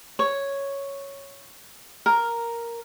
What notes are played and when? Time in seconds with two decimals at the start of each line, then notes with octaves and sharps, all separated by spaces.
0.19 C#5
2.06 A#4